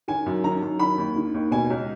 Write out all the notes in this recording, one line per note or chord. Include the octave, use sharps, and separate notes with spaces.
D#3 G#5
F#2
D#3 A#5
F#2
D#3 B5
D#2
D#3
D#2
B2 G#5
C#2